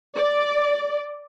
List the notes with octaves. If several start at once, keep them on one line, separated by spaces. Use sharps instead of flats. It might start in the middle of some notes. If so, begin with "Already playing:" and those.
D5